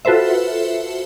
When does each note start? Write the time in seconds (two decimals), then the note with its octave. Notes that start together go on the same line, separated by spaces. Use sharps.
0.05 F4 F#4 A4 B4 C5 E5